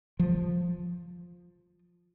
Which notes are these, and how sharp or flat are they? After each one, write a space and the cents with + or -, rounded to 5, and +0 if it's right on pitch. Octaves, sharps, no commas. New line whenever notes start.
F3 +5